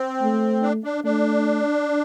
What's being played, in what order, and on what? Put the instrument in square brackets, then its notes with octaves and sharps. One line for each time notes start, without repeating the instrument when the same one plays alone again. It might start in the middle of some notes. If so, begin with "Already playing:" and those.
Already playing: [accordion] C4
[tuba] A3
[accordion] D4
D4
[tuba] A3 [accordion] D4